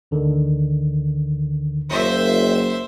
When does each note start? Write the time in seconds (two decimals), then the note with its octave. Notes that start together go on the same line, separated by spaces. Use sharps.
0.11 D2 D3 D#3
1.89 F#1 C5 E5